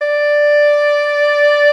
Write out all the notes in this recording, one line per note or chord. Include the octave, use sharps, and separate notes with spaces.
D5